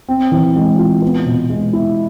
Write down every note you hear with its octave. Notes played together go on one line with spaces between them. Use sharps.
C4
E3
G#3
F4
B3
B2
G#3
E4